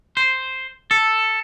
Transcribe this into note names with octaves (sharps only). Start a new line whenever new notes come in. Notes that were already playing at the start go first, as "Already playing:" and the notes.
C5
A4